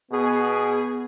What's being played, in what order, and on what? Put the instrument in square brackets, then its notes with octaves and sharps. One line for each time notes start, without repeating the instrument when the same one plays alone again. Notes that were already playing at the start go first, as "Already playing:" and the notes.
[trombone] B2 [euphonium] B3 [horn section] G#4